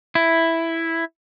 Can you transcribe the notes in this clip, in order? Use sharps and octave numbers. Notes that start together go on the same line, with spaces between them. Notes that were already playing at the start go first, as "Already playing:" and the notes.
E4